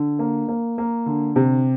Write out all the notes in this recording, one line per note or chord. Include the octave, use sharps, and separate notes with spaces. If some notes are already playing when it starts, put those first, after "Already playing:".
Already playing: D3
A#3
A#3
A#3
D3
C3